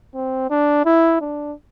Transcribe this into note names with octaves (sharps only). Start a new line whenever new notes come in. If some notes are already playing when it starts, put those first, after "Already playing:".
C4
D4
E4
D4